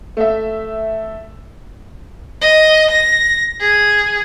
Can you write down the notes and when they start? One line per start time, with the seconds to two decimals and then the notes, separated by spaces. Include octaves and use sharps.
0.17 A3 E5
2.41 D#5
2.91 A#6
3.60 G#4